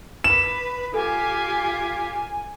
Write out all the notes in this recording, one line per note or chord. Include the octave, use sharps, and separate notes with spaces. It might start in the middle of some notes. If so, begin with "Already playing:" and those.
B4 E7
F4 G4 A4 G#5